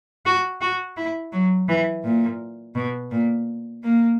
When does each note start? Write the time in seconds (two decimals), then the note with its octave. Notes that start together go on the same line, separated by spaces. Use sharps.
0.26 F#4
0.61 F#4
0.97 E4
1.33 F#3
1.68 E3
2.04 A#2
2.75 B2
3.11 A#2
3.84 A#3